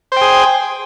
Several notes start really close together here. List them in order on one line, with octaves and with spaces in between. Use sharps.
C5 G5 G#4